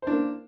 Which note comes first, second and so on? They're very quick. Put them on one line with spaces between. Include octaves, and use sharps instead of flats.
C5 D4 A#3